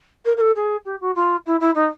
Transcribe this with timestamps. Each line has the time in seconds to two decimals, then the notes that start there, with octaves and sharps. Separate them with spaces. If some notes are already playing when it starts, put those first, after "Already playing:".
0.25 A#4
0.36 A#4
0.41 A4
0.55 G#4
0.85 G4
1.00 F#4
1.15 F4
1.46 E4
1.60 E4
1.74 D#4